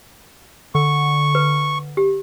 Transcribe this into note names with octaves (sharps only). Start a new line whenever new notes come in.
D3 C#6
B4
G4